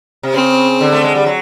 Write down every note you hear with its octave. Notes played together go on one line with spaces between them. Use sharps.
C3
C#3 C4
D3
A3
G#3
G3
F#3